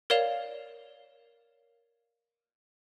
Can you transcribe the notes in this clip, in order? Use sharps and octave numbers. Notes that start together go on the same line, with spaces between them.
A#4 C#5 D5 F5 E7 F7